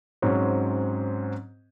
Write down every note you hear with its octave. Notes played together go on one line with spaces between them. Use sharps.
G#2 F#3 C4 C#4